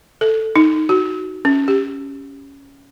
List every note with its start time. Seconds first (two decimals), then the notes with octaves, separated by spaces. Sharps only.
0.21 A4
0.56 D#4
0.89 F#4
1.45 C#4
1.68 G4